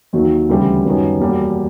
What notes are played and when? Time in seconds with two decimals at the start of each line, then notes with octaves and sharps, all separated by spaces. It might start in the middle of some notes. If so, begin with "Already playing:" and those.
0.13 D#2 D#3 F#3
0.49 D2 C#3 E3 G3
0.85 F#2 D#3 G3 B3
1.20 E2 B2 G3 A#3